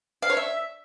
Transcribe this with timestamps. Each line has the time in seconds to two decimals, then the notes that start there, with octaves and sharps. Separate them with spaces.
0.22 F5
0.30 C#5
0.37 E5